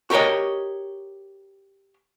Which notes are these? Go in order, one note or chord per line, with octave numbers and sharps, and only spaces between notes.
F#4 G4 A#4 C#5 D#5